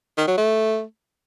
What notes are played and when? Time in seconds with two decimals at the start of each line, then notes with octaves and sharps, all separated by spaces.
0.17 D#3
0.28 F#3
0.38 A3